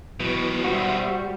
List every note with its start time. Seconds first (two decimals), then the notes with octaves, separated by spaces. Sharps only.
0.20 B2 D#3 E3 F#3 B3
0.65 G3 F#4 C5 E5 C6